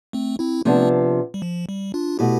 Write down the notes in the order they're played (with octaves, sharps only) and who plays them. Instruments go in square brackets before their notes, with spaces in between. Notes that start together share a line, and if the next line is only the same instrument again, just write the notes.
[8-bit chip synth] A3 C4
C4 E4
[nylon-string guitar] C3 F3 B3 D4 [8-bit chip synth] A3 C4
[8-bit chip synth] G3
F3
G3
D4 F4
[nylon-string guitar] B2 A3 [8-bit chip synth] E4 G4